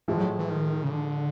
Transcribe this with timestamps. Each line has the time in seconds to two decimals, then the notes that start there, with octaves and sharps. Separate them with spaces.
0.08 A2 E3 F3 G#3
0.18 F#3
0.39 E3
0.49 D#3
0.83 C#3
0.90 D3